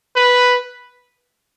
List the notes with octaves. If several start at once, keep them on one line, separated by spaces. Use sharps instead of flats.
B4